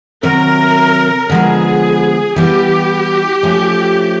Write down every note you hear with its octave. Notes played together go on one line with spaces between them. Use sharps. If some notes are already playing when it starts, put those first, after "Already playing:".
C3 D#3 F#3 A#4
D3 F3 G#3 B3 G#4
E3 G3 B3 G4
F3 A3 C#4